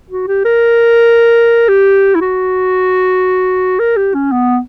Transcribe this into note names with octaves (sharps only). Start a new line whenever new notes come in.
F#4
G4
A#4
G4
E4
F#4
A#4
G4
C#4
B3